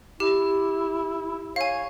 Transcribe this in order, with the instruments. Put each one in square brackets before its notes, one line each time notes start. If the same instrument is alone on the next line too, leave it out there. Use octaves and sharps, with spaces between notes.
[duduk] E4 [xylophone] G4
[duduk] C#5 [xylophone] F5 G#5